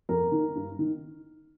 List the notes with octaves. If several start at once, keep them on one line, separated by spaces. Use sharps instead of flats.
F2 A#4
D#3
G2
D#3